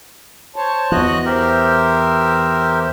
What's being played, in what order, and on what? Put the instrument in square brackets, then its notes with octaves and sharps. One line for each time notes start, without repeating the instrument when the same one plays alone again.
[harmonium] C5 C#5 A5
[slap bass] E2 E3 [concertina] F#4 D#5 F#6
[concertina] G4 A#4 [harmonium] C5 E5